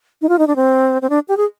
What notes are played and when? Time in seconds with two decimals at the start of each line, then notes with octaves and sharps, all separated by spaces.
0.22 D#4
0.29 F4
0.39 D#4
0.47 D4
0.56 C4
1.02 C4
1.10 D4
1.28 G4
1.37 G#4